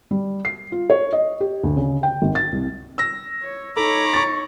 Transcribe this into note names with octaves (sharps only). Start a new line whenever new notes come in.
G3
C7
F4
C#5
D#5
G4
D2
C#3
G5
G#1
A6
C2
E6 A#6
C#5
D#4 A4 C#5 A#5 B5 D6
C#6 A6